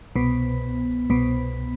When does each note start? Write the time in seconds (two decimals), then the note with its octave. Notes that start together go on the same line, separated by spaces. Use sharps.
0.16 C2 B2 B3
1.10 C2 B2 B3